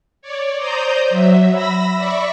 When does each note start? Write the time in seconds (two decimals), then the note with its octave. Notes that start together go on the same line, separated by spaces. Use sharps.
0.22 C#5 D5
0.57 C5 D5 A#5 D#6 G6
1.10 F#3 E5
1.51 B5 E6 A#6
1.97 D5 E5 B5 C#6